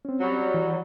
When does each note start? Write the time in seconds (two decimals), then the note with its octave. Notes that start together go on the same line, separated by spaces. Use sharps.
0.05 C4 C#4
0.20 F#3 G3
0.54 E3